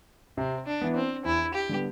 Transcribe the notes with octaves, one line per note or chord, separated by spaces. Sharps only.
C3 C4
D4
E3 B3
C4
E2 E4
G4
D3 G3 B3